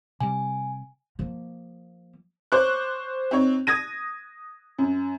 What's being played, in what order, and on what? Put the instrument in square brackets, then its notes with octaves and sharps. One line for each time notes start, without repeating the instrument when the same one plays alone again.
[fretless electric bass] C3 G3 [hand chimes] G#5
[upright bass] F3 A#3
[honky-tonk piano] C5 C#5 C#6 D6 F#6
C4 D#4 C#5
D#6 G#6 A#6 D#7
F#2